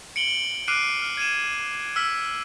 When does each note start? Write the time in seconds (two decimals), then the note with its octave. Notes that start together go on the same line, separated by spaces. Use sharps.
0.16 C#7 D7 F#7 G7
0.68 D6 F6 F#6 C7 D7 D#7
1.02 F6
1.17 G#6 D#7 E7
1.96 E6 F6 B6